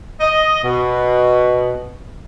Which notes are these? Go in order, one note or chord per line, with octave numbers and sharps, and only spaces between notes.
D#5
B2